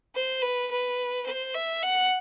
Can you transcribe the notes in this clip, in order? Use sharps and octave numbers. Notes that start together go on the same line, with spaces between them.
C5
B4
B4
C5
E5
F#5